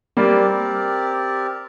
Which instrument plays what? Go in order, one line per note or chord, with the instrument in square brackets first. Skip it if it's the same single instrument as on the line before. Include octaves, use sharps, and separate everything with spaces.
[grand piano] G3 A#3 [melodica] C4 G4 A#4 D5